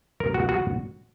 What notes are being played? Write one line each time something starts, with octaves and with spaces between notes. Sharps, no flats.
A#4
F#4
F#4